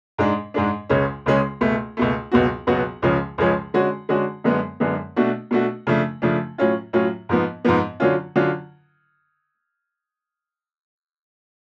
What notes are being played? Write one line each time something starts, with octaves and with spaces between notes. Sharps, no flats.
G#2 G#3 D4
G#2 G#3 D4
C#2 C#3 G#3 C#4
C#2 C#3 G#3 C#4
C#2 B2 A3
C#2 B2 A3
C#2 B2 F#3 B3 F#4
C#2 B2 F#3 B3 F#4
C#2 C#3 F3 G#3 C#4
C#2 C#3 F3 G#3 C#4
D3 G#3 C#4 F#4
D3 G#3 C#4 F#4
F#2 D3 G#3 B3
F#2 D3 G#3 B3
B2 A3 D4 F#4
B2 A3 D4 F#4
C#3 F3 A3 D4
C#3 F3 A3 D4
A2 F#3 C#4 F4
A2 F#3 C#4 F4
G#2 F3 B3
G#2 F3 B3
D3 F#3 C#4 F4
D3 F#3 C#4 F4